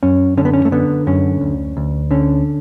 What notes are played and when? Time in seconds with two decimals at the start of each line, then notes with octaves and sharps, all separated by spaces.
0.03 F#2 C#4
0.37 D3 C#4
0.45 B3
0.53 C#4
0.65 A3
0.72 D3 B3
1.07 F#2 C#4
1.41 D2
1.77 D2
2.11 D3 C#4